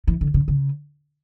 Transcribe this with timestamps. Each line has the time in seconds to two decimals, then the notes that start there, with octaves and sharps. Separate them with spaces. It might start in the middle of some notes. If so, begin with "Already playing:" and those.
0.07 E3
0.21 D3
0.34 C#3
0.48 C#3